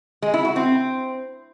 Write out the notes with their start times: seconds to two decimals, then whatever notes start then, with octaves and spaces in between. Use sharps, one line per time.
0.22 G#3
0.34 E4
0.45 F#4
0.56 C4